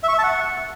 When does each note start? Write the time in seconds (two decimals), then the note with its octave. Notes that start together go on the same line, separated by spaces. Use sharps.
0.03 E5
0.08 C#6
0.13 E5
0.18 A5
0.24 F#5